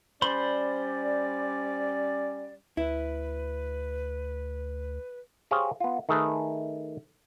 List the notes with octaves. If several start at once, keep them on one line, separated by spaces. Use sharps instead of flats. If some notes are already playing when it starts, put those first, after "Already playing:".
G3 C#4 C5 D5 B5 C6
D2 E4 B4
G4 G#4 C5 C#5 F5
B3 F4
D#3 A3 G#4 A4 B4